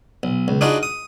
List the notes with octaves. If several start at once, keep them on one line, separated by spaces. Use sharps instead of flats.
B1
C#2
D4 D#4 F4 F#4 G#4 B4
D#6